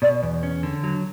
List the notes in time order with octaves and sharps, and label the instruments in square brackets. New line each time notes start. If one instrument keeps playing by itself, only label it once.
[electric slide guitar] B2 [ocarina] D5
[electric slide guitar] E2
C#4
D3
F#3